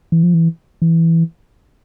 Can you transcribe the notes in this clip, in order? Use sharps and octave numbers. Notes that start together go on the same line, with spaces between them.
E3
F3
E3
E3